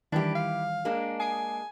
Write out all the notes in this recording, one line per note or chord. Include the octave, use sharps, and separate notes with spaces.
D#3 E3 G3 D4 E4 G4
F5
G#3 A#3 D4
G#5 D#6 C7 D7